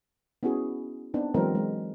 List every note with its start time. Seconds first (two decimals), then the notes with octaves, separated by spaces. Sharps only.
0.43 B3 C#4 E4 F#4 G#4
1.14 B3 C4 D4 D#4
1.34 E3 F#3 G#3 C4 A#4 B4
1.55 G#3